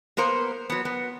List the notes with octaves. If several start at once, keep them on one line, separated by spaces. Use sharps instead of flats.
A#3 B3 A#4 C5
F#3 B3
B3